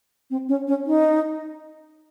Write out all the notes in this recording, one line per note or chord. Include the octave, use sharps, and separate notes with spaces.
C4
C#4
C#4
D#4